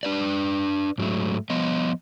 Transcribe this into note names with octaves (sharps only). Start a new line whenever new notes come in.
D4 B4 D5
G#2 F#3 A3
F3 B3 D#5